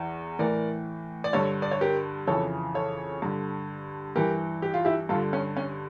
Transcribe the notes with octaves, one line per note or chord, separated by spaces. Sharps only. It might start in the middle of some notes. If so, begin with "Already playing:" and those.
Already playing: E2 E3
A2 E3 A#4 D5
D5
G2 D3 A4 C#5
D5
C#5
G4 A#4
F2 C#3 E3 A4 C#5
A4 C#5
G2 D3
G2 E3 G4 A#4
G4
F4
E4 G4
G2 F4 A4
D3
C#4
C#4